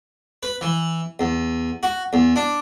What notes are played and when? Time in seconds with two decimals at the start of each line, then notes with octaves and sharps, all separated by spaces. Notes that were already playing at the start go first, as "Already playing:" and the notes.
0.43 B4
0.61 E3
1.19 E2
1.83 F#4
2.13 E2
2.36 D4